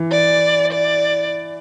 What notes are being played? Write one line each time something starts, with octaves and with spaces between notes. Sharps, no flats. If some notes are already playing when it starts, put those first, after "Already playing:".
Already playing: E3
D5
D5